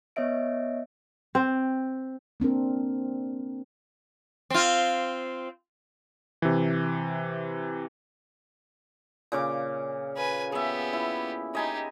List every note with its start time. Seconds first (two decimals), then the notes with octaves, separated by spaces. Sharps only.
0.16 B3 C#5 D#5 E5 D7
1.35 C4
2.40 A#3 C4 D4 A#4
4.50 C4 F4
6.42 C3 E3
9.32 A#2 C#3 D6
10.16 B4 G#5
10.52 B3 G4 G#4 E5
10.93 E4
11.55 D#4 G4 D#5 G#5 B5